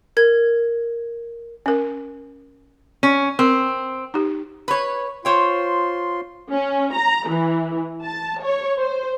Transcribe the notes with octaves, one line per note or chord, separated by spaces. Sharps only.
A#4 G#6
C#4 A#4
C#4
C4 A#4
D#4 G4
B4 C#5
F4 C5 C#5 G5 C6
C#4
A#5
E3
A5
C#5
C5